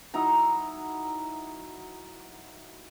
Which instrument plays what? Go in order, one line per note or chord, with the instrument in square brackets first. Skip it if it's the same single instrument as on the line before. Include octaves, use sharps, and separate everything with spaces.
[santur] F#3 D#4 E4 A#5